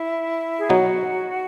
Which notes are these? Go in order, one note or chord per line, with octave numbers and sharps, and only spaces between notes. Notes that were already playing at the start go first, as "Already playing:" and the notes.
Already playing: E4
G#4
B2 F#3 B3 D#4 F#4